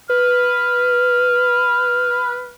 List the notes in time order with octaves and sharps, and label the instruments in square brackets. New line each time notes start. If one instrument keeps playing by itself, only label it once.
[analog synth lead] B4 [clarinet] F6